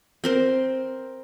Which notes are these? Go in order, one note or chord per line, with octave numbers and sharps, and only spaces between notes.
C4 A#4 C5